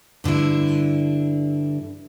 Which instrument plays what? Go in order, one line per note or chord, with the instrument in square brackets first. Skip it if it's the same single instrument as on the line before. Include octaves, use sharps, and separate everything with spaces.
[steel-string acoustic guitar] G2 D3 D4 E4